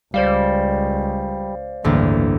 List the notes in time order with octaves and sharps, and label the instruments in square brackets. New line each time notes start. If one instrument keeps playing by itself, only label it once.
[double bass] C#2 [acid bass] G3 [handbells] C5 D5 F5
[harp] A1 D2 A3 [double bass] G2 A#3